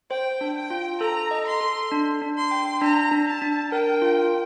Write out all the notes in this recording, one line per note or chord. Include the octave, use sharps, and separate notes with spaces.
C5 G5
D4
G5
F4
A4 A#5
D#5
C6
A4
D4
D4
C6
G5
D4 A#5
D4
A5
D4
A#4 G5
F4